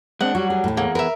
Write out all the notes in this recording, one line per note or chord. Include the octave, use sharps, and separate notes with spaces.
G#3 C4 D4 F#5
F#3 G3 F#4
G#4
D#2 A2
E2 A#3 G#4 F#5
A#4 B4 E5